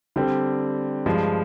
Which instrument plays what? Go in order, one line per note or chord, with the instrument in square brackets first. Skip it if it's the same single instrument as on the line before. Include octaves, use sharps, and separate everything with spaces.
[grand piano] D3 G3 C4 G4
G2 F3 G#3